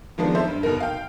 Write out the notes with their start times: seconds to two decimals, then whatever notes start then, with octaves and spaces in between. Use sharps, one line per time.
0.18 D#3 F3 G#3 B3 C4 D4
0.35 D#4 A4 C5 E5
0.48 G2
0.63 F1 B2 D#4 A#4
0.80 F5 G5